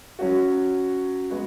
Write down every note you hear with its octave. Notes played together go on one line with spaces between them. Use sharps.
F#3 C#4 F#4
G#3 B3 F#4